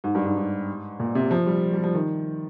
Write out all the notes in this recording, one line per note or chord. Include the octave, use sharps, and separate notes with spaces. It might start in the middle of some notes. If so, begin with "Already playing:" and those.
G#2
G2
G#2
G#2
A#2
C3
F3
G3
G3
F3
D#3